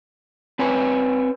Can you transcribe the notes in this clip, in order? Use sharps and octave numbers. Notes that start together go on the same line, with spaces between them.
C4 B4 C#5 G#5